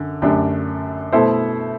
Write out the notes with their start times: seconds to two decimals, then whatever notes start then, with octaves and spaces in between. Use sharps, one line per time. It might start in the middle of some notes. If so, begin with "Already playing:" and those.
Already playing: F#2 D3
0.22 F#2 D3 A3 D4 G4
1.12 B2 A3 E4 A4 C5